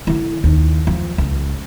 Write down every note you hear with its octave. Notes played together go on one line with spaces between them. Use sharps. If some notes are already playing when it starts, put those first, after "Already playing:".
D3 E4
D#2
F3
C#2